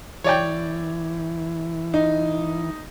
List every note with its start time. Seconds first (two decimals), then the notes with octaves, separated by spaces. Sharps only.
0.24 E3 C#5 D5 G5
1.94 D#4